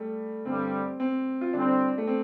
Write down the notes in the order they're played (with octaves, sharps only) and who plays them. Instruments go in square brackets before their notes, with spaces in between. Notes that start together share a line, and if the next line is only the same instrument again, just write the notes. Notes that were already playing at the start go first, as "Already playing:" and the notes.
Already playing: [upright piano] G3 A3
[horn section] G2 D3 G3 [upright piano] C4
[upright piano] C4
F4
[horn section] D3 G3 C4 [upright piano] D4
[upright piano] A3
C4